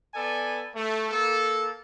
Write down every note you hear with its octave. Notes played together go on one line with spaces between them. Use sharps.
B3 A4 D5 G#5
A3
A#3 A4